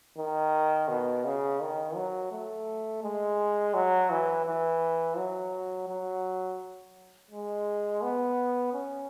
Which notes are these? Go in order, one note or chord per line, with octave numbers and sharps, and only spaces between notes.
D#3
B2
C#3
D#3
F#3
A3
G#3
F#3
E3
E3
F#3
F#3
G#3
B3
C#4